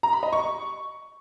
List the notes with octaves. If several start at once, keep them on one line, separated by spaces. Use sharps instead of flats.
A#5
B5
D#5
C#6